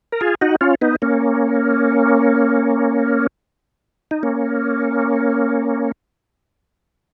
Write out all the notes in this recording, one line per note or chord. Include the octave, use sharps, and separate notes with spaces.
A#4
F4 G#4
D#4 F#4
C#4 F4
B3 D#4
A#3 C#4
D#4
A#3 C#4